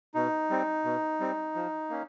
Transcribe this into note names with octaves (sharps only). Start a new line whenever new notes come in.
B2 D#4
G3 C4
B2
G3 C4
F3
A#3 C#4